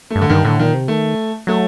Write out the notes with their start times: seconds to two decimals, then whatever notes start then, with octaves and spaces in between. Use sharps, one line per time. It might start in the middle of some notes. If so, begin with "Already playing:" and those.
0.10 A3
0.16 G2
0.21 D3
0.30 G2 D#3
0.45 A2 D3
0.59 A#2 D#3
0.74 C3
0.88 D#3 A3
1.47 F#3 A3